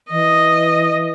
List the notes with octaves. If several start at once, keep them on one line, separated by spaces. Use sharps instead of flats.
E3 D#5